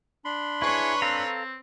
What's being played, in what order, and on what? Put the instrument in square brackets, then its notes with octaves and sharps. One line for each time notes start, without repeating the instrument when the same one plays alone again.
[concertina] D4 B5 C6
[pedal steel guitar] E4 G#4 [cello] B4 C#5 [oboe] C#6
[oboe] C4 [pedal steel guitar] A4 F5 A#5